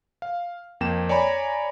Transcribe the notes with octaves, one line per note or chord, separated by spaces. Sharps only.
F5
F2 A#3 G5 E7
C#5 D5 G#5 A#5 B5